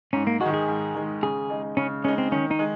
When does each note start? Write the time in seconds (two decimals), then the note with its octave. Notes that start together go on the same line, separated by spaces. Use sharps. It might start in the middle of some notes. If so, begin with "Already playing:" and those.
0.13 G#2 C#4
0.27 A#3
0.41 D#3 G#3 F#4
0.54 G#4
0.68 G#2
0.95 D#3 G#3
1.22 C#3 G#4
1.50 G#3 D#4
1.77 C#3 C#4
2.04 G#3 C#4 D#4
2.18 C4
2.32 D#3 C#4
2.51 D#4
2.59 G#3